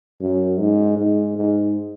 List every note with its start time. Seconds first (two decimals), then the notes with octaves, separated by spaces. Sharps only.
0.21 F#2
0.60 G#2
0.98 G#2
1.37 G#2